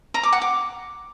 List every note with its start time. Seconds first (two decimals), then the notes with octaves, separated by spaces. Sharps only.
0.14 A#5
0.23 D6
0.32 F#5
0.42 D6